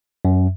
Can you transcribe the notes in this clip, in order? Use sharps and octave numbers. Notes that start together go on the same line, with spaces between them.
F#2